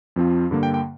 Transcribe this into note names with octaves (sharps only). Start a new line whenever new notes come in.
F2 F3 C4 F4
G2 D3 A#3
G5
G5